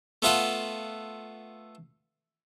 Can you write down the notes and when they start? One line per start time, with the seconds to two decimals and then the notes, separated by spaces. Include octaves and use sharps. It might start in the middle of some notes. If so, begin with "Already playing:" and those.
0.22 A3 B3 F4 A4 F#5